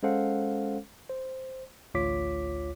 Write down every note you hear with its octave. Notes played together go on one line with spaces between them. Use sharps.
G#3 C#4 A4 C5 F5 F#5
C5
A1 D2 F4 C#5 D6 B6